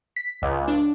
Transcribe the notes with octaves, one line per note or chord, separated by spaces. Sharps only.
B6
C#2
D4